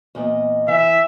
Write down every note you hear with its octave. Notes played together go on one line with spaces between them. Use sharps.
E2 A#2 D#5
E3 E5